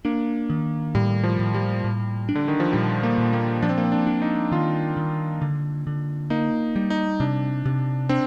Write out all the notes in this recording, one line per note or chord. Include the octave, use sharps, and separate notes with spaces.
A#3 D4
D#3
A2 G3
F3
A2
G3
A2
D4
D3
D#3
F3
A#2 G3
A#3
A#2
A#3
F3 D4
C4
A#3
C4
D4
D4
D#4
D#3 F4
D#3
D3
D3
A#3 D#4
G3
D#4
C3 D4
C3
C4 D4